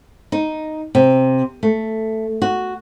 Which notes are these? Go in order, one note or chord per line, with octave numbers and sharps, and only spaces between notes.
D#4
C3
A3
F#4